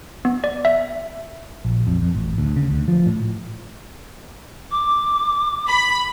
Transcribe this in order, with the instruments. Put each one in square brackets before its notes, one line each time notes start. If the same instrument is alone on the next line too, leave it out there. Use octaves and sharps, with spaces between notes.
[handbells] B3
D5
E5
[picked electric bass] A#1
F2
F2
A1
D2
C#3
D2
F3
A2
[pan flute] D6
[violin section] B5